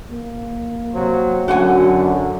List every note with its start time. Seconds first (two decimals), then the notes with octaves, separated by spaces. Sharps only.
0.11 A#3
0.94 C3 F#3 C5
1.48 F#2 D3 F#3 F#4 F#5 G#5